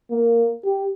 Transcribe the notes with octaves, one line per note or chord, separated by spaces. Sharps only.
A#3
G4